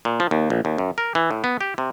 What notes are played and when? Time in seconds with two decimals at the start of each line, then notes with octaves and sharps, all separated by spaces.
0.05 A#2
0.20 F3
0.31 D#2
0.50 A#1
0.65 D#2
0.78 F#2
0.98 A#4
1.15 E3
1.31 A2
1.44 B3
1.61 G4
1.78 C3